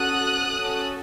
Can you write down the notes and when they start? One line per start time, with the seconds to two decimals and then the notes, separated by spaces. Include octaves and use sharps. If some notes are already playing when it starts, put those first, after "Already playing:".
Already playing: C#4 F#4 A4 D#6 F#6
0.56 C#4 F#4 A4